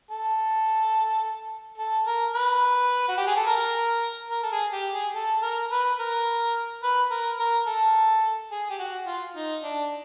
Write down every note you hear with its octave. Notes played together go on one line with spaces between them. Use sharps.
A4
A4
A#4
B4
F#4
G4
G#4
A4
A#4
A#4
A4
G#4
G4
G#4
A4
A#4
B4
A#4
B4
A#4
A#4
A4
G#4
G4
F#4
F4
D#4
D4